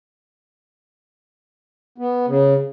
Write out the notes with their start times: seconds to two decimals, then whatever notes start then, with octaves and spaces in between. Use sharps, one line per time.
1.98 B3
2.27 C#3